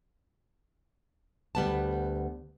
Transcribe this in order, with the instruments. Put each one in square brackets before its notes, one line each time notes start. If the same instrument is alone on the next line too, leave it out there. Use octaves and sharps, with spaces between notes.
[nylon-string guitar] D2 G3 B3 A5